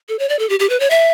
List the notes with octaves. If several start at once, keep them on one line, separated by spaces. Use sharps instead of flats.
A4
C#5
D5
A4
G4
G4
B4
C#5
E5